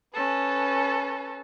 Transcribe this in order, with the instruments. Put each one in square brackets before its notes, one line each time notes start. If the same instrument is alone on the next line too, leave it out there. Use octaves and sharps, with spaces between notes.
[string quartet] C#4 A4 B4